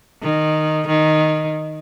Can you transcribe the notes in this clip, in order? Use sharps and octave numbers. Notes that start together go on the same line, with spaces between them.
D#3
D#3